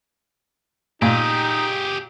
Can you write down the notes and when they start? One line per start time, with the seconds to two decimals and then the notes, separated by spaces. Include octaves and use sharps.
1.02 A#2 D#4 G4 G#4